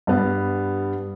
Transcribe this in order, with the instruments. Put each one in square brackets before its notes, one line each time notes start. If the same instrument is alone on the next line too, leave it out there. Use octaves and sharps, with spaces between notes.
[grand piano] G2 G3 B3